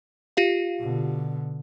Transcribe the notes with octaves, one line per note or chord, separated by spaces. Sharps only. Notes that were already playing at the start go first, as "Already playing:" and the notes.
F4 G4 F5
B2 D3